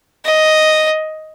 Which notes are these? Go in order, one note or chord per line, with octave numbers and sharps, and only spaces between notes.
D#5